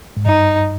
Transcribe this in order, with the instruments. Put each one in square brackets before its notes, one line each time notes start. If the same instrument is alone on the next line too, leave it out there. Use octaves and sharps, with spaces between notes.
[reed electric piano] G#2
[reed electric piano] G2 [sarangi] D#4